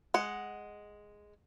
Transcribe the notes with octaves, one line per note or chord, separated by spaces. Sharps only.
G#3 F#5